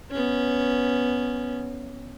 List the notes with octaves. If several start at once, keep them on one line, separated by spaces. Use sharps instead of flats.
B3 C#4